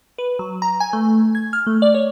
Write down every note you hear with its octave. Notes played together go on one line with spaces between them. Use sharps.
B4
F#3
A#5
G#5
A3
G#6
F6
A3
D5
C#5